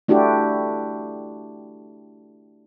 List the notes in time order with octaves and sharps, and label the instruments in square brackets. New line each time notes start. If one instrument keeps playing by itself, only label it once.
[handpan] A3 D4 E4 F#4 G4